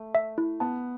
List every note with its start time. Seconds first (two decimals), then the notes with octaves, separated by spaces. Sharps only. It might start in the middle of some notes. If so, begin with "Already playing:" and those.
Already playing: A3
0.15 E5
0.38 E4
0.60 B3 A5